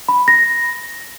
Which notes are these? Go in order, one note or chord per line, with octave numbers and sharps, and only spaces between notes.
B5
A#6